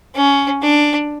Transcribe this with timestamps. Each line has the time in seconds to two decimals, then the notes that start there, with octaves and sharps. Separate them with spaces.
0.15 C#4
0.61 D4